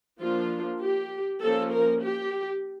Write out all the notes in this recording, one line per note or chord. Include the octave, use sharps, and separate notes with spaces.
F3 A#3 D4 F4
G4
F3 A#3 C#4 A4
A#4
G4